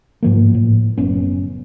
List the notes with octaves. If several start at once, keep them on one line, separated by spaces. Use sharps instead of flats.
G#2 F3 A#3
A2
F#1 B3 C#4